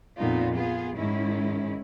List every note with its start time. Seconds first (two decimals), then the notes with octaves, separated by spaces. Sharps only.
0.17 F2 A#2 B3 D#4 F4
0.54 B3 F4 G#4
0.97 G#2 D#3 G#3 C#4 E4